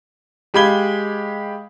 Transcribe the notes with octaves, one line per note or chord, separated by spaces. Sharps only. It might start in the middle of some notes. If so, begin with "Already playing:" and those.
G#3 G4 F5 B5 G#6 G7